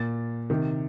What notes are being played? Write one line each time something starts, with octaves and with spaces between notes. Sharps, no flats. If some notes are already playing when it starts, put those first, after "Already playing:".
Already playing: A#2 A6
C3 D#3